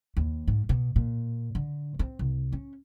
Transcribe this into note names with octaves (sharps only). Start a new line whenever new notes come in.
D#2
G#2
B2
A#2
D3
C4
C2
C#4